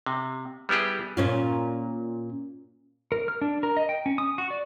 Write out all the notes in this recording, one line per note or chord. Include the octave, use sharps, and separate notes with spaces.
C3
G3 B3 E4 G4 G#4
A#2 C#4 F4
A#4
F6
D4
A#4
D#5
G5
C#4
D#6
F#4
D5